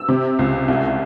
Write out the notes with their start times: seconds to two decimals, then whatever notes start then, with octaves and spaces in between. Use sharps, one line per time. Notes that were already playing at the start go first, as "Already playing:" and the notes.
Already playing: E6
0.08 C3
0.39 C#2
0.68 C2